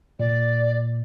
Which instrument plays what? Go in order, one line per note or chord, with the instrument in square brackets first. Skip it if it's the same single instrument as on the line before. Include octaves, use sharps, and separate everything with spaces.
[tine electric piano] A#2 [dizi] D5